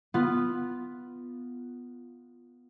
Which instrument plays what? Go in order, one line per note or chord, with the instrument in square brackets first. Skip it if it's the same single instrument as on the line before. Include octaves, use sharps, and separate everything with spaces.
[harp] B3 F4